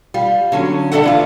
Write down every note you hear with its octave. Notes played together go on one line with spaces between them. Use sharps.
G3 F4
D3 F#3 C#4
G3 D4 A4 D#5 E5 F#5
D3 E3 F4